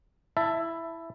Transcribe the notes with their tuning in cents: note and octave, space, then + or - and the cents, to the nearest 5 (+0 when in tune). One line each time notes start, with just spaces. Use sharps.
E4 +0 E5 +10 A5 +10